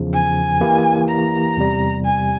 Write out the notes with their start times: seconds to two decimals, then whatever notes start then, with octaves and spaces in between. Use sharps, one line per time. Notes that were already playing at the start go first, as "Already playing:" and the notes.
Already playing: E2 C#3 F3
0.14 G#5
0.61 E3 A#3 E4 G4
1.09 A#5
1.57 E2 C3 G3
2.04 G#5